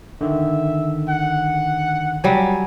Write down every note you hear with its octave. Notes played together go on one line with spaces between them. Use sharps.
D3 D#3 E5
F#5
F#3 G3 G#5